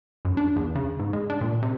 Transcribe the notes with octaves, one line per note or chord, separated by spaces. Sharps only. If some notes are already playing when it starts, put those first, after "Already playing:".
F#2
D4
E2
C#3
G#2
G#3
D4
A#2
C3